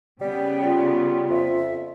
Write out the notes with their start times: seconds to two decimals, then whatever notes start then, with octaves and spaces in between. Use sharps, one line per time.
0.21 C#3 G3 B3 G5
0.63 G3 F4
1.30 F2 E5